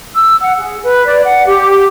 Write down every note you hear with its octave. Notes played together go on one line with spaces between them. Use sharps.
E6
F#5
G#4
B4
D5
F#5
G4